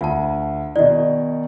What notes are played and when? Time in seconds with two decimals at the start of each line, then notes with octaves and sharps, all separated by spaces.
0.01 D2 F4 A5
0.76 B2 D#3 D#4 D5 D#5